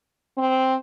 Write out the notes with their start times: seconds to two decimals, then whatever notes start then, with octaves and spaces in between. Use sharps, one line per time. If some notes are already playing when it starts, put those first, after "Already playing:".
0.37 C4